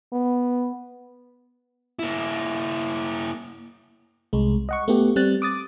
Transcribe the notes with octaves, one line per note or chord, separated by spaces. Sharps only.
B3
A#3 E4
C2 G#3
D#5 F#5 C#6
A3 B3 G4
G3 C4 F#6 A6
D6 D#6 A6